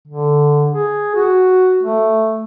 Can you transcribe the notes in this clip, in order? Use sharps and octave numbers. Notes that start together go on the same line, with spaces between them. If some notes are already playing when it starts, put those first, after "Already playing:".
D3
G#4
F#4
A3